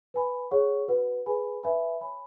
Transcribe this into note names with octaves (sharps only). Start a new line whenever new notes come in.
B4 G#5 B5
G#4 C#5 F#5 C#6
F#4 B4 F#5
G#4 B4 G#5 B5
B4 E5 G#5 B5
C#5 G#5 B5